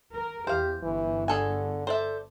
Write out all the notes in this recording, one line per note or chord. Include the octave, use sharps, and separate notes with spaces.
A#4
E2 G4 C5 F5
G1 E3
D3 G#4 A4 G#5
A4 C5 D5 E5